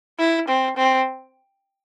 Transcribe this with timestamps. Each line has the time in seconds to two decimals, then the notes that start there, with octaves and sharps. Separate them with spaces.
0.19 E4
0.48 C4
0.77 C4